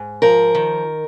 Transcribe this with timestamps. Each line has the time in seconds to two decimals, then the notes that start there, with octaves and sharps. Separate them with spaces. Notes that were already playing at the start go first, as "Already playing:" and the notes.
Already playing: G#2
0.22 F3 A#4
0.55 D#3